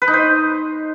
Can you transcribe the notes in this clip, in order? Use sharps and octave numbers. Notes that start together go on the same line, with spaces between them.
B4
D#4
C5